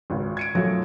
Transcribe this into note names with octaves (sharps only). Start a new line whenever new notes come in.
G#1 C#2
G#6 C#7 D7
B1 F#2 F3 F#3 A3